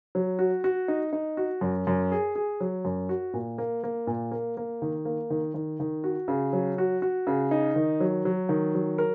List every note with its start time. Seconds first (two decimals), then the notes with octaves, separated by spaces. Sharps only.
0.15 F#3
0.39 F#4
0.64 F#4
0.88 D#4
1.13 D#4
1.37 F#4
1.61 F#2
1.87 F#2
2.12 G#4
2.35 G#4
2.60 F#3
2.85 F#2
3.09 F#4
3.34 A#2
3.58 A#3
3.84 A#3
4.07 A#2
4.31 A#3
4.57 A#3
4.82 D#3
5.05 A#3
5.30 D#3
5.54 D#3
5.80 D#3
6.04 F#4
6.28 C#3
6.53 F#3
6.78 F#4
7.02 F#4
7.27 C#3
7.51 D#4
7.76 D#3
8.00 F#3
8.25 F#3
8.49 D#3
8.75 F#3
8.98 A#4